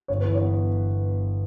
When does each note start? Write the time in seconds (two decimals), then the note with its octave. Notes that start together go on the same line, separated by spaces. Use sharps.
0.08 G1 C#5
0.21 E3 B4
0.34 C#5
0.41 B3